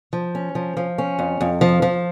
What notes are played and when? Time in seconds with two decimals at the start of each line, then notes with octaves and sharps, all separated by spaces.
0.13 F3
0.35 C#4
0.55 F3
0.77 F3
0.98 C#4
1.19 F2
1.41 F2
1.61 F3
1.82 F3